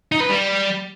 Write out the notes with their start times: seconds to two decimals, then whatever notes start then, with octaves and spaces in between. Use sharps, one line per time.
0.12 D#4
0.20 B4
0.29 G3